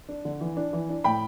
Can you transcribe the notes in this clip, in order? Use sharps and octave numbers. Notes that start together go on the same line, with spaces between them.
D4
D3
E3
D4
E3
D4
A2 G5 B5